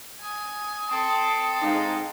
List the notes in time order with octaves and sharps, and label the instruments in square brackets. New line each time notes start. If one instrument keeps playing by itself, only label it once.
[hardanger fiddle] G#5 [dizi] D#6
[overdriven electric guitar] C4 [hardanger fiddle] A4 A5
[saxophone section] G#2 D#4 [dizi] F5